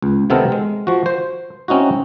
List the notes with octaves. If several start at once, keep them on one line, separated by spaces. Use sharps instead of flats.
C#2
C3 D#3 B3 C4 A4 A#4
G#3
F3 F#4
C5
C4 C#4 D#4 E4 F#4